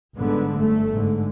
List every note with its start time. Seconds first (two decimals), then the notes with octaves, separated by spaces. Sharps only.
0.15 G1 G#2 D3 B3
0.59 G1 A3
0.92 G#2 D3